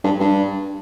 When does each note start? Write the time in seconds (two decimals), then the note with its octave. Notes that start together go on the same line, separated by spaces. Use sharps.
0.04 G2
0.20 G2